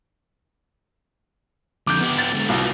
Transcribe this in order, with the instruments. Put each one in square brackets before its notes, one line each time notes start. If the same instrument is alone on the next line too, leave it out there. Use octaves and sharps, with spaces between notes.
[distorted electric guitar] F2 D3 [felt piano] D6 G6
[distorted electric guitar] B3 G4
[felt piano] A6
[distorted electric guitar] G#2 D3
[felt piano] C2 [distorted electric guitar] A#2 F#4